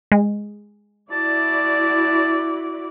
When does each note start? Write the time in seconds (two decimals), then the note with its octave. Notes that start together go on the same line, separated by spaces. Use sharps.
0.12 G#3
1.12 E4 F#4 D5 A5